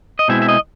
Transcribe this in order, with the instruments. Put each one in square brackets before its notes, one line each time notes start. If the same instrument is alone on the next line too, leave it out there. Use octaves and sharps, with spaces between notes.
[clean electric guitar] D#5
B2 G#3 C4 E4 E5
E5
D#5